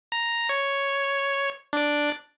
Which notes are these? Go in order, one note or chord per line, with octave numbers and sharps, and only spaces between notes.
A#5
C#5
D4 D5